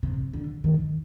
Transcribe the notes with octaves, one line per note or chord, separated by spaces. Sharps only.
C3
D3
D#3